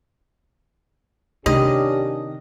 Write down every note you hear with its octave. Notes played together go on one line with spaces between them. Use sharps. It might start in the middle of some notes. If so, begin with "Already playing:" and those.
C3 D#3 C#4 D4 G4 D#5